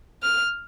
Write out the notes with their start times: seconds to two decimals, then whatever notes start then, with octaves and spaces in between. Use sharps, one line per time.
0.23 F6